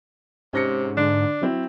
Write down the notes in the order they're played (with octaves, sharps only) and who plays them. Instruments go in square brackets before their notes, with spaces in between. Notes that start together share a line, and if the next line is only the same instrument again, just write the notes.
[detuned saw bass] G#2 [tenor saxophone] C3 [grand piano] C#4 A#6 C#7
[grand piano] D3 [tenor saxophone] D4
[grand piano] F#3 C4 E4